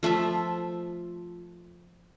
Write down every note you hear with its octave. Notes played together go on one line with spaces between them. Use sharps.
F3 A3 F4 E5